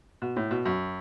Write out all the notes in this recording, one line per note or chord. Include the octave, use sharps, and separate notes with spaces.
B2
A2
B2
F#2